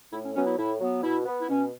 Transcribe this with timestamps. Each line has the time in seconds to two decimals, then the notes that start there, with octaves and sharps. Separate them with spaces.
0.12 A2 E4
0.24 C#4
0.35 F#3 B3 C#4
0.47 E4
0.57 A2 E4
0.80 F#3 B3
1.03 B2 E4
1.26 B3
1.41 E4
1.48 B2 C#4